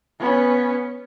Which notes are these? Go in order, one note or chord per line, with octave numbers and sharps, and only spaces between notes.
B3 C#4